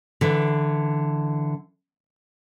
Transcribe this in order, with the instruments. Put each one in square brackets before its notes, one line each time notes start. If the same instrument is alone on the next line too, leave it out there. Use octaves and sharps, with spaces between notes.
[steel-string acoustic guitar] D3 E3